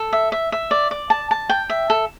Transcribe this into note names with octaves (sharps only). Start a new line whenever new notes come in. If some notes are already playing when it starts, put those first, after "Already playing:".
Already playing: A4
E5
E5
E5
D5
D5
A5
A5
G5
E5
A4